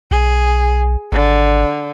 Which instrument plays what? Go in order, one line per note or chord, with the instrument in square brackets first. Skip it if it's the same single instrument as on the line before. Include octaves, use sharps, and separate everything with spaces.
[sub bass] B1 [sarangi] G#4
[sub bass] G#1 [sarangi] D3